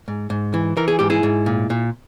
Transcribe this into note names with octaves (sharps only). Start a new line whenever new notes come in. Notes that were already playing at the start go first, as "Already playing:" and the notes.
G#2
G#2
E3
E3 A#4
G#4
G#2 G4
E4 G#4
G#2
A#2
A#2